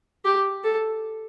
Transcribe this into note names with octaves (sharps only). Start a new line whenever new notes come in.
G4
A4